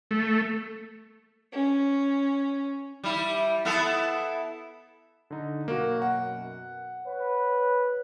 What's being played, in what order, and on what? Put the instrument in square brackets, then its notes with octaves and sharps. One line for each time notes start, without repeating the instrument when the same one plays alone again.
[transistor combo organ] A3
[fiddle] C#4
[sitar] G3 E4
B3 E4 A4
[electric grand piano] D3 D#4
[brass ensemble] F#2 B2 [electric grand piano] A#3 F#4
[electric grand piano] F#5
[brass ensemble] B4 C#5